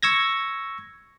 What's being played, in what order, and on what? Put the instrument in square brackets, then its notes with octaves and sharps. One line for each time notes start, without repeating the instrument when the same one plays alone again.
[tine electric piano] C#6 E6 G#6 A#6